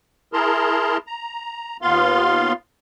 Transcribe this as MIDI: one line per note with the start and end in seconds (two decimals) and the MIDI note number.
0.33 0.97 64
0.33 0.97 68
0.33 0.97 70
0.33 0.97 81
0.33 0.97 82
0.33 0.97 84
1.07 1.77 82
1.82 2.53 39
1.82 2.53 59
1.82 2.53 65
1.82 2.53 77
1.82 2.53 84